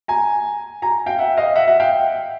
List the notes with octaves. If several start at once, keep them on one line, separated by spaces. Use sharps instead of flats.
G#5 A#5
G#5 A#5
F5 G5
E5 F#5
D#5 F5
E5 F#5
E5 F#5
F5 G5